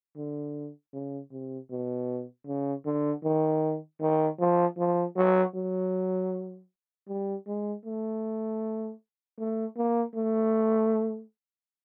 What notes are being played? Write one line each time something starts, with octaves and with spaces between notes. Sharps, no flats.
D3
C#3
C3
B2
C#3
D3
D#3
D#3
F3
F3
F#3
F#3
G3
G#3
A3
A3
A#3
A3